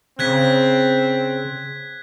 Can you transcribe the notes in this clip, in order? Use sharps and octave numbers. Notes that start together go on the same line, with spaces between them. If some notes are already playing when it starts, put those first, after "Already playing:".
C#3 C4 F#6 G#6 B6